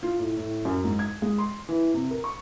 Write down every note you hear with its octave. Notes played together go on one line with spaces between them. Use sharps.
F4
A2
A2
F#2
G#2
G#6
G#3
C6
E3
C3
A#4
C#6